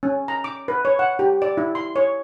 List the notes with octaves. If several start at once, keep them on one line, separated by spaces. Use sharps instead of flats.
C#4
A#5
D6
B4
C#5
F#5
G4
D5
E4
C6
C#5